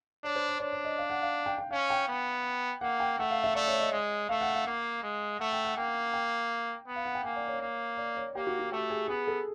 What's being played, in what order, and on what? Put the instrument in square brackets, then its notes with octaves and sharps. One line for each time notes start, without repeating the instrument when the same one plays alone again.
[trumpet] D4 [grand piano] C#5
[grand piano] C5
D5
[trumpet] D4 [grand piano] C#5
[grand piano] D5
D#5
F5
F#5
F5
G5
G5
[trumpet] C#4 [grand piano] F5
[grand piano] G5
[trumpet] B3
[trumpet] A#3 [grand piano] F#5
[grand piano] G5
[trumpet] A3 [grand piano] F#5
[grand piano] F5
E5
[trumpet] A3 [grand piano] D5
[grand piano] C#5
D#5
[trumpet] G#3
[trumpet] A3 [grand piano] F5
[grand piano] F#5
F5
[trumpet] A#3
G#3
[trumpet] A3 [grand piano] F#5
[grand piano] G5
F#5
[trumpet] A#3 [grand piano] G5
[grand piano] G5
[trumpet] B3
[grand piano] F5
F#5
G5
[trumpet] A#3 [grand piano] G#5
[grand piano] D5
C#5
[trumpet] A#3
[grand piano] D5
C#5
[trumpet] A#3 [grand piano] G4
[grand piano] F#4
F#4
[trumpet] A3 [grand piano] G4
[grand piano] G#4
[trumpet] B3 [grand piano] G#4
[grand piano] A4